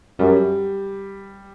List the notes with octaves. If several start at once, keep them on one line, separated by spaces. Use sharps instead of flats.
F#2 G3